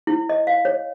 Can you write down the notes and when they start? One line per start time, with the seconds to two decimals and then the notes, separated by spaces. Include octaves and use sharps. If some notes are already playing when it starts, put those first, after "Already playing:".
0.07 E4
0.29 D#5
0.47 F5
0.65 C#5